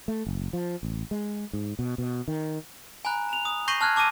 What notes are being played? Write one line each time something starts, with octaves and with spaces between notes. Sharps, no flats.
A3
F#1
F3
A1
G#3
G#2
B2
B2
D#3
G#5 A#5 B5 F#6
A#5 F7
D#6
C#6 G6 A#6 C7 D#7 F#7
A5 F6 F#6 G#6
A5 D6 E6 A#6 D#7